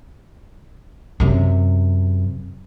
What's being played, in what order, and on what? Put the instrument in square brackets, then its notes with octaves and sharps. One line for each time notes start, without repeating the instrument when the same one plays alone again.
[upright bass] F#2 C3